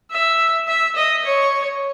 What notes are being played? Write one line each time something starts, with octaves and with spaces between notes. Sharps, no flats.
E5
E5
D#5
C#5